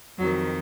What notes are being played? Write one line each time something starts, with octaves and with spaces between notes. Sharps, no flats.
F2 D#3 F#3